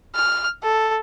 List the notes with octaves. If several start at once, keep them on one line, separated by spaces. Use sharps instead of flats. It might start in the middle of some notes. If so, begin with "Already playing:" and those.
F6
A4